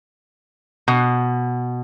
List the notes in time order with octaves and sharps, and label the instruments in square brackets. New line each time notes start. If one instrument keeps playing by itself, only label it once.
[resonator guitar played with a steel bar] B2